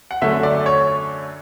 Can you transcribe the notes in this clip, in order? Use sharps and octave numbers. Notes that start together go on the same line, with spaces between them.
F#5
F#2 D3 A3 E5
D5
C#5